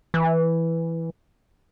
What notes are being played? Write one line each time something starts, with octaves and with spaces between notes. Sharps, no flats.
E3